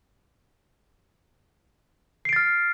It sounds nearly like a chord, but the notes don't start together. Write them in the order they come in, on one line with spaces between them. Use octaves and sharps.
C7 D7 A6 F6